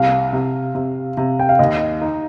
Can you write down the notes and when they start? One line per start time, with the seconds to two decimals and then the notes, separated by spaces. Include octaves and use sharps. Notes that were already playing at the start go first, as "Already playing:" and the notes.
Already playing: C2 F5
0.33 C3
0.75 C3
1.17 C3
1.40 G5
1.49 F5
1.59 D#2 D#5
2.01 D#4